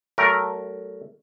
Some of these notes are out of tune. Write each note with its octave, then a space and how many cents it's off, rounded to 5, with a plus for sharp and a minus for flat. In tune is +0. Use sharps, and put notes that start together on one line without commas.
F#3 +35 A3 +0 A#4 +0